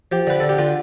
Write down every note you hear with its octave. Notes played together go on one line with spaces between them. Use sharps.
F3 G4
D3 B4
D3 A4
G4
D3 F4